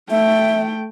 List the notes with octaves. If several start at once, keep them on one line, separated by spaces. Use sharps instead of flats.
A3 E5 G5